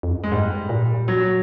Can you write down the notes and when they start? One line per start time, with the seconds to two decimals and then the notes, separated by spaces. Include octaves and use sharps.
0.03 F2
0.13 F#2
0.23 G2 G#3
0.32 G#2 G3
0.69 A#2
1.08 F#3